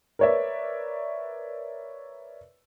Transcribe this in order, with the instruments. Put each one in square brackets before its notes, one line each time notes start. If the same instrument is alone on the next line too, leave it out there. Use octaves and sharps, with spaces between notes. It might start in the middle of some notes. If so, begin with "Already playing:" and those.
[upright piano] A#4 B4 C#5 D5 E5